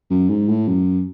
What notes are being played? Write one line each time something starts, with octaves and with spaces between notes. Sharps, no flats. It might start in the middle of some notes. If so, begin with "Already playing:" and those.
F#2
G#2
A2
F#2